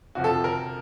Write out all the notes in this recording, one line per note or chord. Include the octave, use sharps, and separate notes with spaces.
F2 C3 F3 F#4
A4
A#4